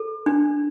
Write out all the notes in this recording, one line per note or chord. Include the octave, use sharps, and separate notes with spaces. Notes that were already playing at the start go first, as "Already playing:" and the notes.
Already playing: A4
D4